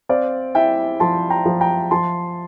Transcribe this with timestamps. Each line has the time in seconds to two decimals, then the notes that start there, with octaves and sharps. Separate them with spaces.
0.09 C4 D5 F5
0.55 E4 E5 G5
1.00 F3 A5 C6
1.30 G5 A#5
1.46 F3
1.61 G5 A#5
1.91 F3 A5 C6